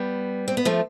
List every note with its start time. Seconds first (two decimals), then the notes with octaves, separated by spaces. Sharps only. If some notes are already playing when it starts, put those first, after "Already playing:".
Already playing: G3 B3
0.48 C4
0.57 B3
0.65 F3 A3